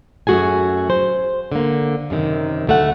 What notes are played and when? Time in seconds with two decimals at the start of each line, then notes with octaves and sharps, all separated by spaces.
0.27 F#2 A3 F#4 G#4 G#5
0.90 C5
1.52 D3 A#3
2.10 F#2 C3 D#3
2.67 D2 A3 F#5